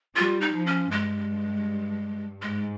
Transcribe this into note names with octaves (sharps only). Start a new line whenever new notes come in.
G3 F4
D#4
F3
C#4
G2 G#3
G#2 G#3